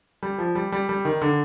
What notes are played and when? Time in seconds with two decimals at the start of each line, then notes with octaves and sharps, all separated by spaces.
0.23 G3
0.38 F3
0.55 G3
0.72 G3
0.89 G3
1.05 D#3
1.22 D3